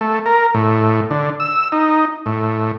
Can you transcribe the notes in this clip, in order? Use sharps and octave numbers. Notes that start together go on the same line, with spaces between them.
A3
A#4
A2
D3
E6
D#4
A2